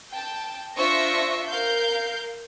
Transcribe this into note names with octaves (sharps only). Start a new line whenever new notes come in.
G5 A5
D4 F4 C5 E5 C#6 A#6
A#4 F5 G6